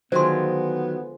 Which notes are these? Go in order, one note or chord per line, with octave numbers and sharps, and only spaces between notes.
D3 D#3 F3 F#3 G#3 B3 C5 C6